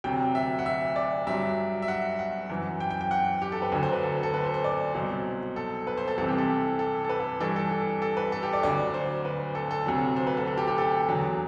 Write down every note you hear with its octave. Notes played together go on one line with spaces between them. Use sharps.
D2 C3 F#3 G5
E5
F#5
E5
D5
G2 F#3 E5
E5
F#5
F#5
F#2 E3
G5
G5
G5
F#5
G4
A4
B4
D2 D3 F#3
C5
B4
A4
A4
B4
C5
C5
D5
C2 B2 F#3 C5
A4
B4
C5
A4
C2 C3 E3 A4
G4
A4
A4
A4
B4
A4
G2 E3 A4
A4
A4
A4
B4
A4
G4
D5
D2 D3 F#3 D5
C5
B4
A4
A4
D2 C3 F#3
C5
B4
A4
A4
G4
G4
A4
E2 D3 F#3